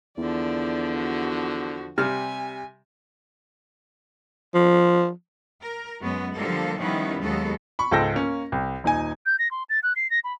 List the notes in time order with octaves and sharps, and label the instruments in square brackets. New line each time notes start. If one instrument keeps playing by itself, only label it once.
[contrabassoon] E2 [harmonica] D3 F3 [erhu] D5
[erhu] F#4
[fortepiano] C3 G3 F6 [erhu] G#5
[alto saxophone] F3
[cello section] A#4
F#2 F#3 G#3 B3 C#4
D3 F3 G3 A#3 A4
D#3 F3 G3 B3 C#4 E4
D#2 F#3 G#3 B3 A4
[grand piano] B5 C#6
C#2 G#2 A4 G5 E6 A#6
A#3 C#4
C2
D#1 D#4 G#5
[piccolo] G6
A#6
C6
A6
F#6
C7
A#6
B5